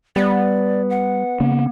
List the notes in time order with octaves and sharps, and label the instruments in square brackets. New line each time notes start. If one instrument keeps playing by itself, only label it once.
[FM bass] G3 [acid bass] B3 [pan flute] D5
[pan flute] F#5
[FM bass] C#3 [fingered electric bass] A#3 B3